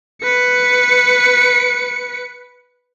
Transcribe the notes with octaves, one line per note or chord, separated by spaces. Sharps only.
B4 C#7